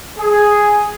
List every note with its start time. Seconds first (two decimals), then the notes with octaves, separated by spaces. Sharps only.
0.17 G#4